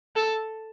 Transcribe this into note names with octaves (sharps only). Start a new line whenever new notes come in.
A4